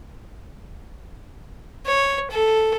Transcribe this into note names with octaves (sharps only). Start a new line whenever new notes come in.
C#5
A4